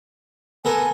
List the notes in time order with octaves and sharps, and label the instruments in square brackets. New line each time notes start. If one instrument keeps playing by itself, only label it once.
[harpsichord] B3 A4 A#4 [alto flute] G#5